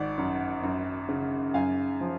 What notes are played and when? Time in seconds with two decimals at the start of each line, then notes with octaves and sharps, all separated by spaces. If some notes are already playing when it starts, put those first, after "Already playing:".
Already playing: G#1 D5 F#5
0.18 F#2
0.63 F#2
1.09 C#3
1.54 F#2 F5 G#5
2.01 F3